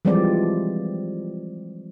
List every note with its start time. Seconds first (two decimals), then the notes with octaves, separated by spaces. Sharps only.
0.05 E3 F3 G3 G#3 C4 D5